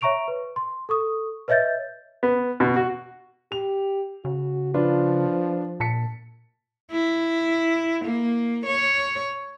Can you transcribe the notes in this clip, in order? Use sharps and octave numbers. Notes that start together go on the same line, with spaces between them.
C#5 E5 A#5 C#6 D7 F7
B4
C6
A4 C#6 D#6
B4 C#5 D#5 E5 G6 A6
B3
B2
F#4
G4 F7
C#3 F#4
F3 D4 F4 B4
A#2 A5 B6 C#7
E4
A#3
C#5